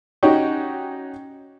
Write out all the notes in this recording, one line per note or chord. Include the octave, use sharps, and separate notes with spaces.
C#4 D#4 F#4 G4 C#5 G5